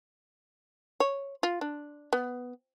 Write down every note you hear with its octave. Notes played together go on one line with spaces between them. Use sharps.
C#5
F4
D4
B3